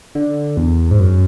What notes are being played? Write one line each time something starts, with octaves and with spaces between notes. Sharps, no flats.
D3
E2
G#2
F#2